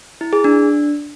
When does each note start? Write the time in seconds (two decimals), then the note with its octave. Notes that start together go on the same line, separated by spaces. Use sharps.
0.21 E4
0.33 G#4
0.44 D4